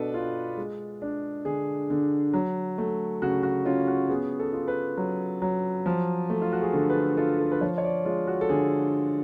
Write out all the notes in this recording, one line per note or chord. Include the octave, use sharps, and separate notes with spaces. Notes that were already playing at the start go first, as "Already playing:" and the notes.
Already playing: B2 D4 A4 B4
F4
G#3
D4
D3 G#4
D3
F#3
A3
C#3 F#4
F#4
C#4 F4
F#4
B3 G#4
A4
F4
B4
F#3
F#3
F3
A3
F4
F#4
G#4
D3 A4
B4
A4
F4 A4
A4
B4
F3 C#5
C#5
D5
G#3 F4
F#4
A4
D3 G#4